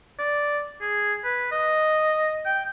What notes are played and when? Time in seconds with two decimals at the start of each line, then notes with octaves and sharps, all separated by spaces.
0.19 D5
0.81 G#4
1.24 B4
1.51 D#5
2.46 G5